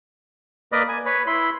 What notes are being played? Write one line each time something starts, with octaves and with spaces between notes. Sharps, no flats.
A#3 A#4 B4 D5 D#5
G#5
B4 C#5
E4 B5 C6